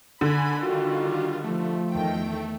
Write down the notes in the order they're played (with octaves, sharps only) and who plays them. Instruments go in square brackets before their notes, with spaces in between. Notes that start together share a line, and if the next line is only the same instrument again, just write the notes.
[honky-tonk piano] D3 [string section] G#5 B5
[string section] D#3 G3 [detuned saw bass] F4 [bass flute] F#4
[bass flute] F3 [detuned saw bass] A3
[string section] E2 D#3 G5